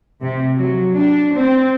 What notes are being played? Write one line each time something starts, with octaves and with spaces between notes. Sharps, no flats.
C3
F#3
D4
C4